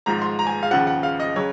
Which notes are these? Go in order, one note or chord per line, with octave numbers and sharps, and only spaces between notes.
G#1 G#2 F3 A#5
C6
A#5
G#5
F5
D#2 C#3 F3 F#5
F#5
F5
D#5
C#3 F#3 C#5